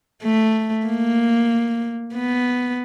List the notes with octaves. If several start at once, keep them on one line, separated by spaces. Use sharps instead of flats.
A3
A#3
B3